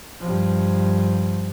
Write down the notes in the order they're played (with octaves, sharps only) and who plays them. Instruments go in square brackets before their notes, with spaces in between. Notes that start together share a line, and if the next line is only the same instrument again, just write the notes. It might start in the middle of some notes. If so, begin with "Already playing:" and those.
[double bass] G2 F3